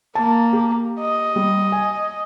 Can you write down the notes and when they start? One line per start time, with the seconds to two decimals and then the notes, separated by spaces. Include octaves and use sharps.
0.15 A#3 A5
0.53 G4
1.00 D#5
1.36 G3
1.72 G#5